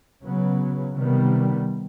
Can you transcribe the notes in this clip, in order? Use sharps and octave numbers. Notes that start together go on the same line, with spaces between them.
C#3 F#3 B3
C3 D#3 G3 B3